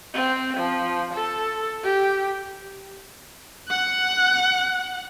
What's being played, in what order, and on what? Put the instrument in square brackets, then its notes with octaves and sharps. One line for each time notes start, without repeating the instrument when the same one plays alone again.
[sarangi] C4
F3
A4
G4
[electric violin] F#5 F#6